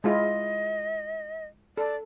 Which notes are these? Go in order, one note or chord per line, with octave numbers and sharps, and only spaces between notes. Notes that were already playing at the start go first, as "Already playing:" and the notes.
G#3 E4 F4 D#5
A4 D5